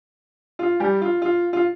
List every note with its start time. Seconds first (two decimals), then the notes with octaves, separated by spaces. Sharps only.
0.59 F4
0.80 G3 G4
1.02 F4
1.22 F4
1.53 F4